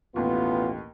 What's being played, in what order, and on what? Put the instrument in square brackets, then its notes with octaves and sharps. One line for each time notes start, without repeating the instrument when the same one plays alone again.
[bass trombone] A1 [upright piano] D#2 B2 [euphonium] B3 [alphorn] F4